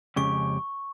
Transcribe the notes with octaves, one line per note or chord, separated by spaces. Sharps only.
F2 C#3 G#3 C#4 G4 C#6